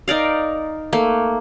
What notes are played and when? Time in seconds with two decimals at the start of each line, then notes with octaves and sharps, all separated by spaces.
0.08 D#4 A#4 D5 F5
0.93 A3 A#3